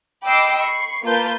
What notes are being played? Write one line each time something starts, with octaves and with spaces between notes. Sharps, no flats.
D#5 G5 B5 D6 E6 C7
B5 C#6 C7
A#3 F4 B4 A5 G6